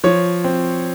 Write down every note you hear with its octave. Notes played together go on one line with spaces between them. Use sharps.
F3 C#5
C4